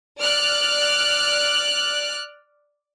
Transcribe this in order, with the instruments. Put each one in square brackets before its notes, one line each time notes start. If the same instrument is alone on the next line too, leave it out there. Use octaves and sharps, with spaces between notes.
[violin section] D5 F6 F#6